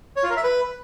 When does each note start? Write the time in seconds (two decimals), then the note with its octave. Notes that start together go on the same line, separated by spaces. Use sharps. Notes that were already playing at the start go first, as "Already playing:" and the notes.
0.16 C#5
0.23 F4
0.30 A#4
0.37 E5
0.44 B4